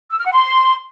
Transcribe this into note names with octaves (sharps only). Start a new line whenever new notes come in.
E6
F6
F#5
C6